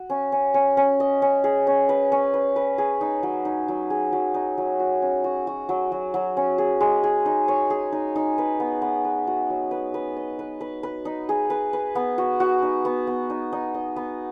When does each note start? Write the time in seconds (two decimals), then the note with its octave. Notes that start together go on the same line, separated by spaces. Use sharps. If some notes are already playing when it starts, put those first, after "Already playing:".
Already playing: F#4
0.10 C#4
0.32 C#4
0.54 C#4
0.77 C#4
1.00 D#5
1.22 C#4
1.44 G#4
1.67 C#4
1.89 B4
2.12 C#4
2.34 B4
2.56 B4
2.78 G#4
3.01 D#4
3.23 F#3
3.45 D#4
3.68 F#3
3.90 G#4
4.13 F#3
4.34 D#4
4.58 F#3
4.80 F#4
5.02 C#4
5.24 F#4
5.47 F#4
5.69 F#3
5.92 F#3
6.14 F#3
6.37 C#4
6.58 G#4
6.81 G#3
7.03 G#4
7.26 D#4
7.48 C#5
7.70 G#4
7.92 D#4
8.16 D#4
8.38 B4
8.60 B3
8.82 B3
9.05 B4
9.27 F#4
9.50 F#3
9.71 B4
9.94 B4
10.17 D#5
10.39 B4
10.61 B4
10.83 B4
11.05 D#4
11.29 G#4
11.50 B4
11.73 B4
11.95 B3
12.18 F#4
12.40 F#4
12.62 D#4
12.85 B3
13.07 B3
13.30 D#4
13.52 D#4
13.74 D#5
13.96 B3